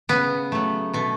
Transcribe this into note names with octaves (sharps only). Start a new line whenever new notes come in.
C#3 B3
F#3 A3
B2 A3